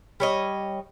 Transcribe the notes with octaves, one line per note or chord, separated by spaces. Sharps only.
G3 C#5 D#5